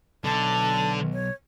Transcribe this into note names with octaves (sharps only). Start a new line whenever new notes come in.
B1 D3 A5
C#5